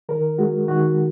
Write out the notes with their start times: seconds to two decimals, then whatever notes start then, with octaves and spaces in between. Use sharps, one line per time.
0.09 D#3 A#4
0.38 G#3 F#4
0.68 D#3 F#4